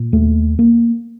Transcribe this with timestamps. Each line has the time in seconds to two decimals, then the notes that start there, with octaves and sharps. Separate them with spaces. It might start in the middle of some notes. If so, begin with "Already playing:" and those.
Already playing: A#2
0.13 D#2 A3
0.59 A#3